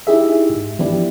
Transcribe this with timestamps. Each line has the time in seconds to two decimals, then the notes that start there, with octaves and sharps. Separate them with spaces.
0.07 D#4 E4 G4 G#4 E5
0.50 G#2
0.79 E3 F3 B3 D4 E4 G4